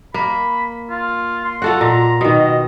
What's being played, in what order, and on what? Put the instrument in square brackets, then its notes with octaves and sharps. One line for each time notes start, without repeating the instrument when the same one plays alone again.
[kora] A#3 [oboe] B5
[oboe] F4
C6
[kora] F4 A4 F#5 [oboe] F#4
[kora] A#2 [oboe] A#5
[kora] B2 D#3 [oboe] D#5